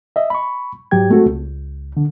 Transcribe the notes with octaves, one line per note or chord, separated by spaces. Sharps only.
D#5 E5
B5 C#6
G#2 F#3 G4 G5 G#6
G#3 A3 C4 F#4 A4
C#2
D3